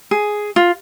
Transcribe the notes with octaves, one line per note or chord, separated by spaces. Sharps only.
G#4
F4